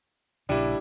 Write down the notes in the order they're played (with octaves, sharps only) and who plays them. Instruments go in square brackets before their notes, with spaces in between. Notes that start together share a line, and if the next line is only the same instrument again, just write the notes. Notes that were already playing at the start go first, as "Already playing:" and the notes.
[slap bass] A#1 C#3 [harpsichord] G3 [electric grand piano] D4 E4